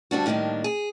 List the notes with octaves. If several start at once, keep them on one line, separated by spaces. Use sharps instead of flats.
D2 G3 D4 F#4
A2 D#3 G3 A#3 D4
G#4